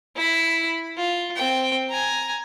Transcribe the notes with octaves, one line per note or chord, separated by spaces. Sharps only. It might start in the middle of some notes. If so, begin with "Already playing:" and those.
E4 B5
F4
C4 G5
G#5 A#5